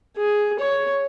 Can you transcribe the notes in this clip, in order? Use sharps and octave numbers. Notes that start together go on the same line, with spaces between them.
G#4
C#5